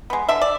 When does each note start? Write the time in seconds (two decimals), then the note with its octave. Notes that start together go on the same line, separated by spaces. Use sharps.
0.10 G#3 B3
0.29 D3 E5
0.41 D5